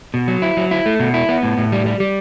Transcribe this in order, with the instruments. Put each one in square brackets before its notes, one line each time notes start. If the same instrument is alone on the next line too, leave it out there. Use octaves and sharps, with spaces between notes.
[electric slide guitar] B2
F#3
E4
F#3
E4
A3
B2
E4
B3
A2
A2
G3
G3
G3